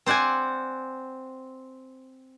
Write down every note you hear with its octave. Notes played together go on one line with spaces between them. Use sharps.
C4 C5 D5 F#5 G#5